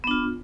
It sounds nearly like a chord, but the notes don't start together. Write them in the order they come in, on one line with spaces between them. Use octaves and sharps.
B3 D4 F4